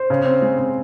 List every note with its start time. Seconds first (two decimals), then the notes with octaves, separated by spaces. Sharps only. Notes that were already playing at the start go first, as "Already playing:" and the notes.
Already playing: C5
0.10 C#3
0.26 C4
0.42 G#3
0.58 C#3